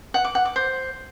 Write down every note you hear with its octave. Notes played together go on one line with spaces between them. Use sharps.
F#5
D6
F#5
D6
C5